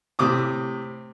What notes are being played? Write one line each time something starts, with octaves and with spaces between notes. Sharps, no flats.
A2 C3 D6 D#6